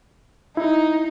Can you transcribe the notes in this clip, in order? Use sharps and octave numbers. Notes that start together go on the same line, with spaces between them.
D#4 E4